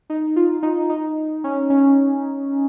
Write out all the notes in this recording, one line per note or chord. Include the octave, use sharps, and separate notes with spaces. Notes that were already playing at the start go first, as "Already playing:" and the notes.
D#4
F4
D#4
D#4
C#4
C#4